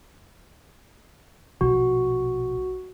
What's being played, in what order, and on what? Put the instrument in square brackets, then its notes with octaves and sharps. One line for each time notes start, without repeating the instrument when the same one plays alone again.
[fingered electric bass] A#1 B2 F3 [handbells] F#4